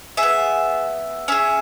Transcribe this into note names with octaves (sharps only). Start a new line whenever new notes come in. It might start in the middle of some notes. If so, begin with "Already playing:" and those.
G#4 E5
B3
C#4 G#4 E5